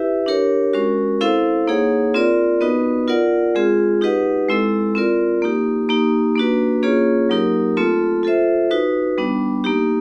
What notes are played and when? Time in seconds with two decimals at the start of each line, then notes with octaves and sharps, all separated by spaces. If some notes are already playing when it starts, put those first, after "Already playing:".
Already playing: E4 G4 B4 E5
0.26 D4 G4 A#4 C#5
0.73 G#3 C#4 F#4 A#4
1.21 C4 E4 A4 C5 F5
1.68 A#3 D#4 G#4 C#5 F#5
2.14 C4 F4 A#4 D5
2.61 B3 D#4 F#4 B4 D#5
3.08 F4 A#4 D5 F#5
3.55 G#3 C4 F4 G#4
4.01 D#4 G4 B4 D#5 F#5
4.49 G#3 C4 E4 A4
4.95 C4 F4 A#4 D5
5.42 A#3 D#4 G4
5.89 A#3 D#4 G4
6.36 A#3 D4 F#4 B4
6.83 A#3 C#4 F4 G#4 C#5
7.29 F#3 A#3 D#4 G4 A#4
7.77 A3 C4 F4 A4
8.23 F4 A4 C5 E5
8.71 D#4 F#4 B4
9.18 G3 B3 D4
9.64 A#3 D#4 G4